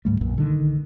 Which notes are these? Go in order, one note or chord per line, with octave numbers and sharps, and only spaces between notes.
D2 G#2 G3 A3
B1 F#2 A#2
D3 D#3